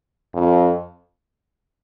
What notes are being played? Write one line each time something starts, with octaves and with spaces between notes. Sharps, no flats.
F2